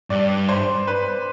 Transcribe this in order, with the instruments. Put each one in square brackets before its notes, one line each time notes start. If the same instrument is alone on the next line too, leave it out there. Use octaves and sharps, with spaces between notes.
[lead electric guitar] G2 [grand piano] D5
[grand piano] C5
B4